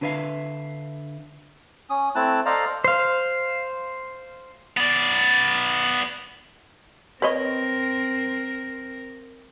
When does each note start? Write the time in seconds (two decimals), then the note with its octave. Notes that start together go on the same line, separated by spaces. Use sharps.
0.01 D3 D4 B4 C#5 E5 F5
1.90 C#4 D#6
2.15 A3 C4 E4 A5 F#6
2.46 A4 C5 D5 D#5 F5 A#5
2.84 C5 F5
4.77 B3 D5
7.22 C4 A#4 B4 C#5 D#5